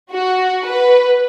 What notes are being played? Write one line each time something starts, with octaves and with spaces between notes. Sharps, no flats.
F#4
B4